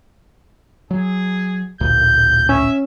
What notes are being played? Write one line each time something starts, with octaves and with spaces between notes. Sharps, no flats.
F#3 G#4
A1 D2 A#2 G6
C#4 E5